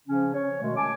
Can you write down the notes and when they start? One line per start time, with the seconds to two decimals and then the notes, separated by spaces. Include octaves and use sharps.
0.06 C#3 F3 C#4
0.33 C#5
0.60 B2 D#3 G#3 A3
0.76 G#5 A5 D6